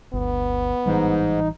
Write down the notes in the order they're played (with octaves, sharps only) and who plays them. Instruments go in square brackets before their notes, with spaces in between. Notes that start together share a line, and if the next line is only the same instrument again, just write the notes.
[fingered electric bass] G1 D2 [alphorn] B3
[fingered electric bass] A1 E3 G3 [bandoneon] G#2 [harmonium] D#4